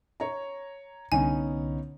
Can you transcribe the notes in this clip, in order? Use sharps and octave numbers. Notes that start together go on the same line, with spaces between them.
C#5 A#5
C2 D3 B3 C#4 D#4 G#5